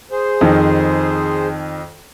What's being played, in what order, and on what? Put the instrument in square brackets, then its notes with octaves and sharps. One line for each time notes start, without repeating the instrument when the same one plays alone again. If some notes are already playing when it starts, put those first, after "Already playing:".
[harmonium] G#4 C5
[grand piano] F2 D#3